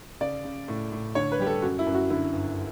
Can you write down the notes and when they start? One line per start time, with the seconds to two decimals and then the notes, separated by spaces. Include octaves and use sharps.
0.21 C#3 D5
0.44 C#3
0.68 A2
0.92 A2
1.15 D3 C#5
1.32 B4
1.40 G3 G4
1.47 A4
1.62 F#2 F#4
1.79 E4
1.86 F#2
1.94 F#4
2.10 D3 E4
2.33 G1